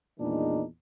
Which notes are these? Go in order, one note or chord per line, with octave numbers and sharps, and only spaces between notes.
E2 A#2 D#3 G#3 D4 D#4